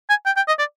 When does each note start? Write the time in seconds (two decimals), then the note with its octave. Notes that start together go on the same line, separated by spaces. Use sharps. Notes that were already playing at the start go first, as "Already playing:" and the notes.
0.10 G#5
0.26 G5
0.36 G5
0.48 D#5
0.59 D5